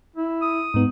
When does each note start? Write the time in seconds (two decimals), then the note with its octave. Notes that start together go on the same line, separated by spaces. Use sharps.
0.16 E4
0.42 D#6
0.74 G#2 B3 D#4